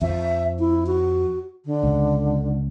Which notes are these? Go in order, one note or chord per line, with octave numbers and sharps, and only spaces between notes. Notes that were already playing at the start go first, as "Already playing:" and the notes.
F2 F3 E5
E4
F#4
D3
C#2